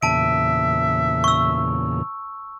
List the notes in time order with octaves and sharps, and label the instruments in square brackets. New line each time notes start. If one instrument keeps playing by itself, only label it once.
[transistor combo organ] E2 A#2 C#3 [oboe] E5 [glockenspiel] A5 D7
[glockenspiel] C#6 E6